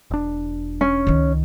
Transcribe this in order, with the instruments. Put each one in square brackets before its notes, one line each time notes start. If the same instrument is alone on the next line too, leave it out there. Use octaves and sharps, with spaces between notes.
[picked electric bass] E1 D4
[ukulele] C#4
[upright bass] C#2 D#3